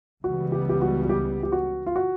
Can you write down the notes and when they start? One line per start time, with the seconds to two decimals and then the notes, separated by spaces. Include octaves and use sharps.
0.24 C#2 C#3 E3 G3 B3 F#4
0.52 G4
0.69 G4
0.82 F#4
1.03 F#4
1.09 G4
1.43 G4
1.52 F#4
1.86 F4
1.96 F#4